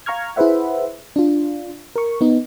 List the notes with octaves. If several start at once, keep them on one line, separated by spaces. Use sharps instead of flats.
F5 A#5 C#6 F6 G#6
E4 G#4 B4 C5 E5 F#5
D4 F4
A#4 C#6
B3 D#4